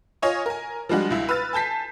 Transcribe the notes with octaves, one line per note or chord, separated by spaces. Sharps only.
F4 C#5 D#5 G#5 C#6
A#4 G#5
F3 G3 G#3 D4 F#4
C#2 E4
B4 E6 F6 A6
G#5 A5 G6 B6 C7